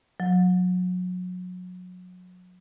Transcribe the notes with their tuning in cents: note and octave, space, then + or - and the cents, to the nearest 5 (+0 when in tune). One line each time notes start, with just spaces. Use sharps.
F#3 -30